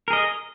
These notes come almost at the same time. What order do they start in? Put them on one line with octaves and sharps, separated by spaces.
A#4 G#4 D#5